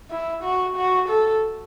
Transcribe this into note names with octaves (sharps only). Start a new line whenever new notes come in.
E4
F#4
F#4
A4